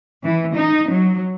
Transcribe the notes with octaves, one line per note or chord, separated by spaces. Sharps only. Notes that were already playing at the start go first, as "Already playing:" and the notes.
E3
D#4
F#3